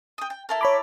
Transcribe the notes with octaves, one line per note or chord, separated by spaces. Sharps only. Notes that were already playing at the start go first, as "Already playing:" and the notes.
G5 D#6
G5
E4 A4 A#4
C#5 B5 D6